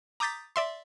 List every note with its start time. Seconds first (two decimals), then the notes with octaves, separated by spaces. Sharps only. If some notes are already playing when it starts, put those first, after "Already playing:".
0.20 A#5 D6 D#6 G6 A6 B6
0.56 D5 E5 C6